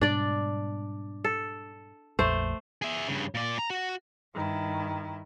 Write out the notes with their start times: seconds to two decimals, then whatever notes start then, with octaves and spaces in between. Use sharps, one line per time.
0.01 G#2 B2 G3 D4 D5
1.24 A4
2.19 A#1 F2 A3 C5
2.82 G#4 E5
3.08 G2 C#3
3.35 A#2 D5
3.59 A#5
3.70 F#4
4.34 G2 D#3 E4